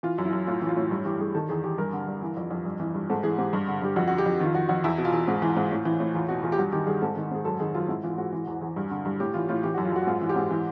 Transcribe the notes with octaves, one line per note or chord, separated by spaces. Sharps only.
E3 F4
F#2
E4
F#2
A2 F4
E3
F4
A2
G2
E3 G4
G2 G#4
D#3 A4
E2 G#4
E2 G4
G2 A#4
D3
G2
E3
F2
F2
G2
E3
G2
G#2 A4
E3 G#4
G#2 G4
G2
D3
G2 G4
F2 F#4
D3 F#4
G4
F2
D#3 F4
F2 F#4
F2 F#4
E2 E4
B2
F4
E2
G#2
E3
G#2
A2
E3
A2
E2 F4
B2 F#4
E2 F4
G4
G2 F#4
D#3 G4
G2 G#4
G#2 A4
D#3
G#2 G#4
F#2 A4
D#3 G#4
F#2 F4
G#2 E4
E3 F4
F4
G#2 F#4
E3
E2
E2
G2
D3
G2
A2 G4
E3 F4
A2 F4
E3 G4
F#2 F#4
F4
F#2 F#4
F#4
G#2 F4
E3
G4
G#2
E3